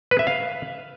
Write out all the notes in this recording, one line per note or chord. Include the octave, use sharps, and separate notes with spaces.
B4
E5
F5